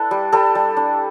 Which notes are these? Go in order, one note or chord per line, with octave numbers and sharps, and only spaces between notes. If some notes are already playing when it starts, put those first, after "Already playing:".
Already playing: D4 E4 A4 B4
G3
G3 A4
G3
D4